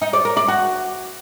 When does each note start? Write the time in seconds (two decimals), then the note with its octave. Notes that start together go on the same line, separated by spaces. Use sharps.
0.02 D#4
0.13 D5
0.25 A#4
0.37 D5
0.48 F#4